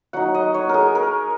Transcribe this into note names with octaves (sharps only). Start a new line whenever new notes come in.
F#3 D#4 F#5
D#5
C#5
G#4 A#4
A#4